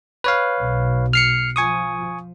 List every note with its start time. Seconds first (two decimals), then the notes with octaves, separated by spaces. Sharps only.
0.24 B4 C#5 F5
0.62 B1
1.13 F6 C7 C#7
1.56 F3 G#5 C#6 D#6